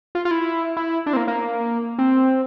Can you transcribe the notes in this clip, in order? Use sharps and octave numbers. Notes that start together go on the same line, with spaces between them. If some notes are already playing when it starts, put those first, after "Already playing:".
F4
F4
E4
E4
D4
C4
A#3
A#3
C4